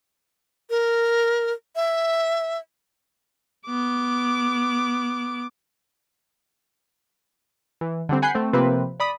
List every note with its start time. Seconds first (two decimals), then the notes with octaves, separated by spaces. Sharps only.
0.70 A#4
1.76 E5
3.66 B3 D6
7.81 E3
8.09 D3 G3 C4
8.22 F#5 G#5 B5 F#6 G6 C7
8.35 A3 C4
8.53 C3 F3 A#3 C4 B4
9.00 D5 B5 D#6